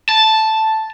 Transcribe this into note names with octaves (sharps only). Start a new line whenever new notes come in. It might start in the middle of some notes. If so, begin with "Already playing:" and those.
A5